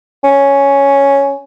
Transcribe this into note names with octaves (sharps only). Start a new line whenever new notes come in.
C#4